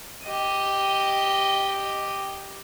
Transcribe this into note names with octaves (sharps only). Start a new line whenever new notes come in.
G4 D#5